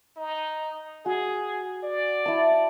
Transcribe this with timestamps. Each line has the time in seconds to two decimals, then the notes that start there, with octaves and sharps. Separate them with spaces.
0.17 D#4
1.06 F#4 G#4
1.83 D5
2.26 E4 A5